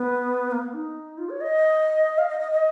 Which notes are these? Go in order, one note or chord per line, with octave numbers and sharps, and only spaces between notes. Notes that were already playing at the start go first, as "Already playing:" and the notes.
Already playing: B3
A#3
B3
D#4
F4
C#5
D#5
F5
D#5
D#5
D#5